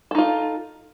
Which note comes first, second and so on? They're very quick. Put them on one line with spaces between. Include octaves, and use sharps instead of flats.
A4 D#4 F4